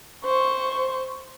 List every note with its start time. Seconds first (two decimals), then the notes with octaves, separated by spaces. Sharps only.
0.25 C5 C#6